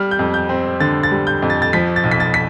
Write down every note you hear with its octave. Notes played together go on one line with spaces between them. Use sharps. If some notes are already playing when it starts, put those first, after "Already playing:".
Already playing: G3 F6
G6
F2
G6
C4
D3 A6
A6
G3
G6
F2
A6
A6
F3 B6
A6
B1
B6
A6
B6